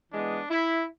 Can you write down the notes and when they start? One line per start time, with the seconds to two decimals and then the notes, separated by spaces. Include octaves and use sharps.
0.12 E3 G#3 B3 D4
0.50 E4